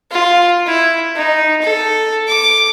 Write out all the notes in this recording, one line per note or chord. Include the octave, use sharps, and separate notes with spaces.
F4
E4
D#4
A4
D6